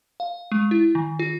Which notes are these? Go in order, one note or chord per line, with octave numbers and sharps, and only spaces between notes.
F5
G#3
E4
D#3
F4